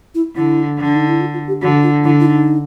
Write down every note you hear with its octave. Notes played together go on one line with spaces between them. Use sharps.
E4
D3 E4
D3
D4
D#4
E4
F4
F4
G4
D3 F#4
F4
D3 E4
E4
D#4